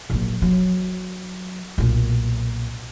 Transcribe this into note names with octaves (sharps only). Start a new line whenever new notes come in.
A#1 F#3
F#3
B1 A#2